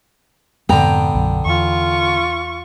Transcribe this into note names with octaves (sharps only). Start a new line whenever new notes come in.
F2 G#2 B2 D3 B3 G5 A#5
B1 F#2
E2 F4 C#6